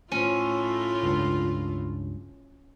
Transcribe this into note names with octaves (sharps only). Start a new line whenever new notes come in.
A2 A3 C#4 F4
C#2 G2